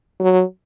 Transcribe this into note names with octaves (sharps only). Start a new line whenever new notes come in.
F#3